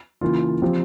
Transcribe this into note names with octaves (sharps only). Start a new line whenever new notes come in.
C#3 E3 A#3 F4
F3 C4 G4